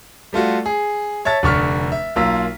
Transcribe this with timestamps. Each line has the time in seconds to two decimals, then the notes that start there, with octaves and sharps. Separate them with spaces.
0.33 G3 A3 F4 F#4
0.66 G#4
1.25 C#5 E5 A5 A6
1.43 F1 D3 C#6 F6 B6
1.92 E5
2.16 B1 A#3 F4 E6 B6